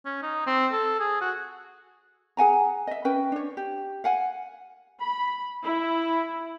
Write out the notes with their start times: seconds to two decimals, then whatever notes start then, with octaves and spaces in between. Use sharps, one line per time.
0.05 C#4
0.22 D#4
0.46 C4
0.71 A4
1.00 G#4
1.21 F#4
2.37 G#4 F#5 G#5 A#5
2.87 D#5 E5
3.05 C#4 B4 G5
3.32 D4 C#5
3.57 G4
4.04 F5 F#5 G#5
5.01 B5
5.64 E4